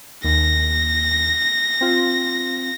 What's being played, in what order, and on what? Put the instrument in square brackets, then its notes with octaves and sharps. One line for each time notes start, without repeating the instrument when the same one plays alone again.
[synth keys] D#2 [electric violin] A#6
[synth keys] C4 F4